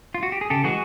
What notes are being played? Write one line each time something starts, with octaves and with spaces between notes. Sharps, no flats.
F4
F#4
G4
G#4
C#3 G4 A4
E3 G#3 F#4 G#4